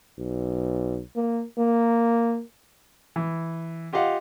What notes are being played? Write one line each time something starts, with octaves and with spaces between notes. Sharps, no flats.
B1
A#3
A#3
E3
F4 G4 D#5 F5 F#5